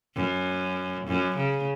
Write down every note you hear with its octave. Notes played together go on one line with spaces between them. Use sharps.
F#2
F#2
C#3